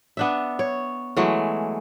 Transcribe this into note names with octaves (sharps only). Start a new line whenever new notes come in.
B3 D4 E5
C#5
E3 F#3 G#3 A3